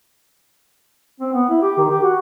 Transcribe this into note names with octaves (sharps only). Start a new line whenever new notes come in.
C4
B3
E4
G4
D#3
G4
F#4